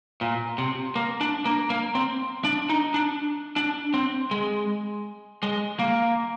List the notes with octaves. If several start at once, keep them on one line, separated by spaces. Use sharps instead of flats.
A#2
C3
A#3
D4
A#3
A#3
C4
D4
D#4
D4
D4
C4
G#3
G#3
A#3